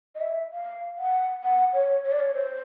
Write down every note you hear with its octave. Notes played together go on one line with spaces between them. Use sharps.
D#5
E5
F5
F#5
F#5
C#5
C#5
D5
C#5
C5